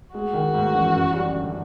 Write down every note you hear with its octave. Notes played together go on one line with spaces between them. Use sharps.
G#3 F#4
D#3
G#2
A1
F#2
G3
D3